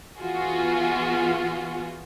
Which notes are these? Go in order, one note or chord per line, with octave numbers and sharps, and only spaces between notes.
E3 B3 F4 F#4 G#4